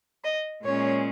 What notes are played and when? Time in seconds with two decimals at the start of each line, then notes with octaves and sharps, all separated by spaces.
0.23 D#5
0.63 A#2 G#3 C#4 C#5